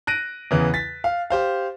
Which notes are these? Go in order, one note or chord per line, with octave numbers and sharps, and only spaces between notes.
F#6 A#6 D7 D#7
E2 C#3 E3
A6 B6
F5
G4 C5 F5